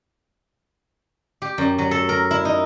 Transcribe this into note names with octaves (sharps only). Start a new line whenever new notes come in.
G4
F#2
F#3
A4
A#4
E4
D#4